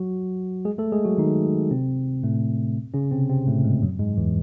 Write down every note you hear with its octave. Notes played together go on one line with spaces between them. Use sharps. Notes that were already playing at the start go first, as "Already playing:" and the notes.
Already playing: F#3 F#4
G#3 G#4
A3 A4
G#3 G#4
F#3 F#4
D#3 D#4
C3 C4
A2 A3
C#3 C#4
C3 C4
C3 C4
A2 A3
G#2 G#3
F#2 F#3
G#2 G#3
E2 E3